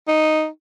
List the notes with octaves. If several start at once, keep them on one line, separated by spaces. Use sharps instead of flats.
D#4